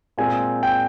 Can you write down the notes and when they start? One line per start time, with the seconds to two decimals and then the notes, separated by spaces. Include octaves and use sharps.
0.18 A#2 G#3 C4 G#5
0.63 G5